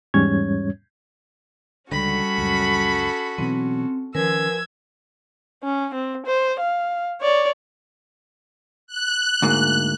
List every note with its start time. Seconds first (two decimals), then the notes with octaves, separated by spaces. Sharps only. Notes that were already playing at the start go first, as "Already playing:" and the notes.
0.14 E2 G#2 G3 C#4 C#5 G#6
1.92 C#2 D3 G3 C#4 F#4 A4 B5
2.38 C#2 F#2
3.38 B2 E3 F#3 C4
4.15 D#3 F3 C#4 A#4 B4 G#5 E6 G#6
5.64 C#4
5.94 C4
6.26 C5
6.60 F5
7.21 C#5 D5
8.87 F#6
9.42 D2 G#2 A#3